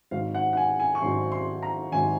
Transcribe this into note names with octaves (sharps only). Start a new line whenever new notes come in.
G#1 G#2 F#3 C4 F5
F#5
F#5
G#5
G#5
C#6
G#1 G#2 F#3 C4 C6
C6
A#5
G#1 G#2 F#3 C4 G#5